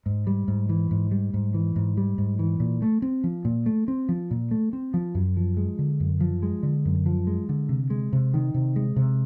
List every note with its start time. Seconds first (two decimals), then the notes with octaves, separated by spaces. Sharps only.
0.06 G#2
0.27 G3
0.48 G#2
0.69 E3
0.91 G#2
1.11 G3
1.34 G#2
1.54 E3
1.76 G#2
1.97 G3
2.18 G#2
2.39 E3
2.60 A#2
2.82 A3
3.02 C4
3.24 F3
3.45 A#2
3.66 A3
3.88 C4
4.09 F3
4.31 A#2
4.51 A3
4.73 C4
4.94 F3
5.15 F#2
5.37 F3
5.57 G#3
5.79 D3
6.00 F#2
6.20 F3
6.43 G#3
6.63 D3
6.85 F#2
7.06 F3
7.27 G#3
7.49 D3
7.69 C3
7.90 G#3
8.13 C3
8.34 D#3
8.54 C3
8.76 G#3
8.96 C3